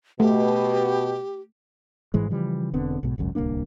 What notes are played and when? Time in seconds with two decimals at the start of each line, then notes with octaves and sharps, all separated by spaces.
0.20 B2 A3 G4
2.14 A1 G#2 E3 G#3
2.30 C#3 E3 F3 G3
2.73 E1 D3 B3 C4
3.03 B1 G#2 B2
3.18 G#1 C#2 F#2
3.35 D1 C2 A#3 D4